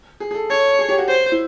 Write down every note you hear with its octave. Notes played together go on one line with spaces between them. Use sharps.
G#4
G#4
A4
A4 C#5
G#4
G4
F#4
C5
E4